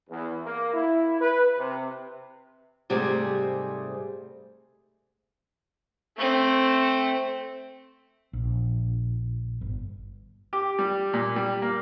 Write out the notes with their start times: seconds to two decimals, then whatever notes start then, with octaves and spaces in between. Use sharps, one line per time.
0.10 E2
0.45 A#3
0.74 E4
1.21 B4
1.58 C3
2.90 G#2 C3 G3 A3 C4 G#4
6.18 A3 C4
8.33 A#1
9.61 G1
10.53 G4
10.79 G3
11.13 A#2
11.36 G3
11.62 A#3